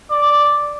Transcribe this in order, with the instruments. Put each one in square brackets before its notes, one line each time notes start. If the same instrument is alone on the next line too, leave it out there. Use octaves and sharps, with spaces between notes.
[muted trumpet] D5